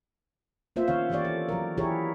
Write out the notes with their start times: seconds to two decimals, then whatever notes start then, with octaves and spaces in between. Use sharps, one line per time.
0.76 A#3 B3 F4 C5 E5
0.88 D#3 C#4 C#5 F5
1.10 E3 A#3 G4 C#5 D5
1.25 A4
1.49 F#3 A#4
1.77 E3 E4 G4 G#4 A#4 C#5